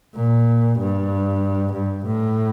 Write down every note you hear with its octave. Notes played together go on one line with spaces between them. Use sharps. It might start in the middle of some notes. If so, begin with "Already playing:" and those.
A#2
G2
G2
A2